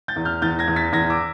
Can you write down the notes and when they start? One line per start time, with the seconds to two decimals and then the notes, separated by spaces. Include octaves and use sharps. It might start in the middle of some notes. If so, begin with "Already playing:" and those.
0.08 G6 A6
0.16 E2
0.25 F6 G6
0.42 E2 G6 A6
0.59 G#6 A#6
0.68 E2
0.76 A6 B6
0.93 E2 G#6 A#6
1.10 D6 E6